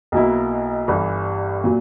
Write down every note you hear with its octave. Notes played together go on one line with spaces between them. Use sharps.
B1 B2 A#3 E4
G1 G2 E3
A#2 F#3